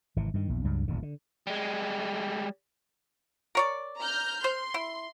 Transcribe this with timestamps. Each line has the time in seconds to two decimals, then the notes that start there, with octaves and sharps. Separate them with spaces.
0.16 G#1 C3 E3
0.34 G2 D#3
0.49 A#1 E2
0.64 C#2 G2 F#3
0.88 D#1 A1 D2 D3
1.03 D3
1.47 G3 G#3
3.55 A#4 C#5 D5
3.99 A#5 F6 G6
4.44 C5 C6
4.74 E4